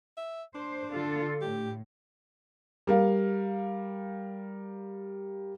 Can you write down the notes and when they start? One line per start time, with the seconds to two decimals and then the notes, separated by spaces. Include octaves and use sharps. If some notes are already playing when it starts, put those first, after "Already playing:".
0.17 E5
0.55 D4 C5
0.91 D3 F4 A4
1.41 A2 G4
2.87 G3 A#4 F5